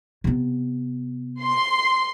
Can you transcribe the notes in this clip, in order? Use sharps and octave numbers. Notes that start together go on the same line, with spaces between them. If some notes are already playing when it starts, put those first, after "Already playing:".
C3 B3
C6